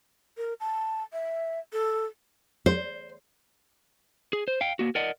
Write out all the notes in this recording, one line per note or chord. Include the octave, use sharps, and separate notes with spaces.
A#4
A5
E5
A4
C5
G#4
C5
F5 G5
A#3 F#4
A#4 D5 D#5 F#5